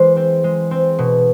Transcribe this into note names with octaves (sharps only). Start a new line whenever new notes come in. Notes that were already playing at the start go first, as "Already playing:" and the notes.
Already playing: E3 G#3 C5
C4
G#3
C4
B2